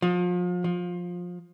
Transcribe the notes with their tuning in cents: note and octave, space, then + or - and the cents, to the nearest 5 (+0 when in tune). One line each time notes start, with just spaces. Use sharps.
F3 +35
F3 +20